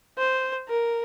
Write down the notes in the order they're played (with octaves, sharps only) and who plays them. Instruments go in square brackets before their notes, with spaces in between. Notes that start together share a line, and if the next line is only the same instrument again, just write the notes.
[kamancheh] C5
A#4